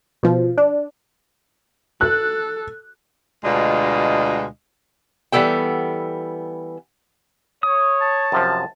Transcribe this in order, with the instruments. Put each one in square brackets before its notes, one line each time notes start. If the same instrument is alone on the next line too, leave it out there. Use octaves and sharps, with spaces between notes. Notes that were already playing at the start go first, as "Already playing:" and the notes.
[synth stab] B2 F3
D4
[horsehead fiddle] A4 [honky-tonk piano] F#6
[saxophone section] D2 B2 G#3 D4 F4 D#5
[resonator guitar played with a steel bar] E3 G3 B3 A4 G5
[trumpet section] C#5 [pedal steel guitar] D#6
[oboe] A5
[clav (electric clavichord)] F#2 C3 F3